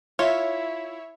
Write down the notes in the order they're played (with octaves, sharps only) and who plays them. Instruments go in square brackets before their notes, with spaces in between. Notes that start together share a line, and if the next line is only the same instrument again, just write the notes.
[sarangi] E4 [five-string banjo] F4 [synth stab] C#5 E5